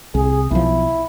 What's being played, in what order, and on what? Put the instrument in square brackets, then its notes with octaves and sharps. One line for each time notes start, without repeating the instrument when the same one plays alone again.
[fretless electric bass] C2 [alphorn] G#4
[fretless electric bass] B1 F3 [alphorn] E4